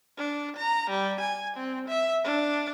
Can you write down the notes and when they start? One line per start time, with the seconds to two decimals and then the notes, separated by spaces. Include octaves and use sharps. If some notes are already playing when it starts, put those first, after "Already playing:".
0.18 D4
0.57 A#5
0.90 G3
1.21 G#5
1.56 C4
1.88 E5
2.25 D4